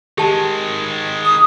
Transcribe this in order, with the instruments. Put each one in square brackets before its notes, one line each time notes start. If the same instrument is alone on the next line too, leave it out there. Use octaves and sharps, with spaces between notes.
[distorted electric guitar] D#3 G#3 [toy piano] G4 A5
[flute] D#6